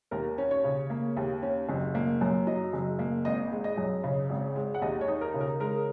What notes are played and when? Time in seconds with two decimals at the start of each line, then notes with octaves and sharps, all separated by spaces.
0.11 D#2 A#4
0.38 C#4
0.51 C#5
0.64 C#3
0.90 A#3
1.17 D#2
1.43 C#4
1.69 F#1
1.95 A#3
2.21 F#2
2.47 F#3 D#5
2.73 F#1
2.99 A#3
3.25 G#1 D#5
3.52 G#3
3.64 D#5
3.77 F#2
4.04 C#3
4.29 G#1
4.56 G#3
4.74 F#5
4.82 D#2 D#5
5.01 C#5
5.08 D#4
5.21 A#4
5.34 C#3
5.41 A#4
5.60 G#3 A#4